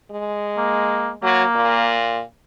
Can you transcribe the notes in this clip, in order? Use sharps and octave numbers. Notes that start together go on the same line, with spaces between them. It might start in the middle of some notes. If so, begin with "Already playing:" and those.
G#3
A#3
F#3 A#3
A#2